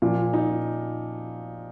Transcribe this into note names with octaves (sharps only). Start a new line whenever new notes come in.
A#2 F3
D#4